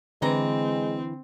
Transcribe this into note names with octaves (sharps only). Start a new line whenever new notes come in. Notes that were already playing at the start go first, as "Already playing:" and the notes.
D3 E3 G#3 C4 A#5